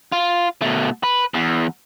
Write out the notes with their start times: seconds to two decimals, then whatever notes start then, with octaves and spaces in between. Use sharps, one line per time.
0.12 F4
0.62 B2 A3
1.03 B4
1.34 E2